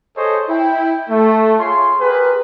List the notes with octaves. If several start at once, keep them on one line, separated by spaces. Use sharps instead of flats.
G#4 A4 C5 C#5 D#5
E4 G5
A3
F4 G#4 C#5 C6
G4 G#4 A#4 B4